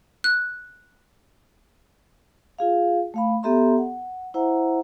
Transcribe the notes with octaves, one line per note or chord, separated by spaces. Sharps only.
F#6
F4 G#4 F5
A3 F5 B5
B3 G4 A4 E5 A#5 C6
F#5
E4 C5 E5 F#5 A#5